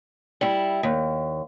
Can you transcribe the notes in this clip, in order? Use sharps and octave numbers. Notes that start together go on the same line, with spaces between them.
G3 E4
D#2